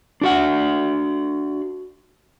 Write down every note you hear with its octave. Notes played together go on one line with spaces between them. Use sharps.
D4 F#4 F#5